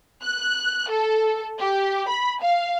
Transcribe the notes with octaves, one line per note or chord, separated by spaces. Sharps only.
F#6
A4
G4
B5
F5